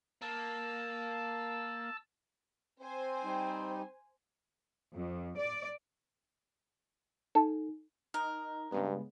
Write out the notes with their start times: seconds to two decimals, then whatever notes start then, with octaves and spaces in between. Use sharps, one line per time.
0.22 A#3 A5 E6
2.80 C4 C5 G#5
3.24 G3 D#4
4.94 F2
5.38 D5
7.35 D#4 A4
8.14 D#4 A#4
8.72 G2 C#3 G#3 B3